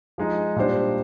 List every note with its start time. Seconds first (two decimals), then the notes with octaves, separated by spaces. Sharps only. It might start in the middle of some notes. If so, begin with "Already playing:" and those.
0.18 F3 G#3 D#4
0.56 A#2 G3 D4 G4 C5